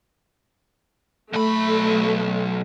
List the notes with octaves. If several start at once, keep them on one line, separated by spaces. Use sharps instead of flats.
B1 A3 B5